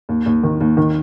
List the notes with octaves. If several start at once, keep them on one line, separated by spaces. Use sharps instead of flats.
D#2
D#2
D#3
D#2
D#3